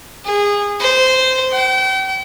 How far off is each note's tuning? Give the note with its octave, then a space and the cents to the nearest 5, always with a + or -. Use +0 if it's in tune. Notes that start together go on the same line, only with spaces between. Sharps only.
G#4 -20
C5 -15
G5 -40